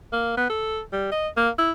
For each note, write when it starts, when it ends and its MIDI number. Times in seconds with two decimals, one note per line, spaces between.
0.13 0.34 58
0.37 0.49 59
0.49 0.81 69
0.92 1.11 55
1.12 1.28 75
1.37 1.50 58
1.58 1.72 64